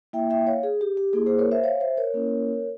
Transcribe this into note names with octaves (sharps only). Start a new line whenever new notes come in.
A#3 E4 E5 G5
E5 G5
C#5 F5
G#4
G4
G4
A#3 E4 G#4
G#4 C5
A#4 C#5
C5 E5
C#5 F5
C5 E5
A#4 C#5
A#3 C#4 E4